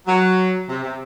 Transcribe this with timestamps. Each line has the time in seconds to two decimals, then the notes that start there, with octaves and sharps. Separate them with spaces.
0.07 F#3
0.69 C3
0.84 C3